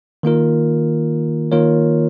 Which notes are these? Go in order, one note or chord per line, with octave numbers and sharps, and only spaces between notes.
D#3 A#3 F4 A#4
D#3 A#3 F4 A#4 C#5